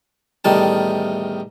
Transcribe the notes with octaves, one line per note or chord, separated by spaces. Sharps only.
E2 A2 D#3 G3 A5